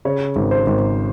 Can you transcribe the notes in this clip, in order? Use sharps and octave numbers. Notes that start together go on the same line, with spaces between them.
C#3 C#5
G#1
C5
G#1